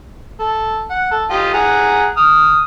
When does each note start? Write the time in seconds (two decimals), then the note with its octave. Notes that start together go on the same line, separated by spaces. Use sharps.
0.40 A4
0.90 F#5
1.11 A4
1.31 F4 G4 D#5
1.54 G#4 F#5 A#5
2.17 D#6 F6